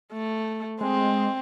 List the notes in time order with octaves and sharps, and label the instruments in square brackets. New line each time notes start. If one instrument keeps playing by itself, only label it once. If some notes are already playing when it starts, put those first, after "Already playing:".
[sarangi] A3
[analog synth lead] G#3 [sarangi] C4